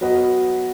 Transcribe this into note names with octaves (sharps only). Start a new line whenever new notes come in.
F#3 B3 F#4 B4 D#5